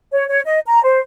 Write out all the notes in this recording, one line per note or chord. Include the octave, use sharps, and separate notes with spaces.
C#5
C#5
D#5
A#5
C5